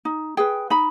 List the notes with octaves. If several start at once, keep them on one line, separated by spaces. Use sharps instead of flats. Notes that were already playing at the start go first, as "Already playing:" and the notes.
D#4
G#4 B4 G5
D#4 B5